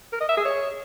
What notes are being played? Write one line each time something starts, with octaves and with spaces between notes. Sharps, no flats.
A#4
D#5
E5
G#4
C#5